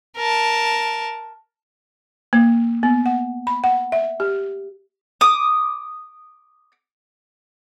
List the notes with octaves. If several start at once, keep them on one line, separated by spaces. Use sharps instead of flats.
A#4 A5
A#3
B3
F#5
B5
F#5
E5
G4
D6 D#6